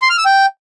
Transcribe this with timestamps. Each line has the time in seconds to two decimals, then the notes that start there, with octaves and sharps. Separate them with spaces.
0.02 C6
0.10 F6
0.18 E6
0.26 G5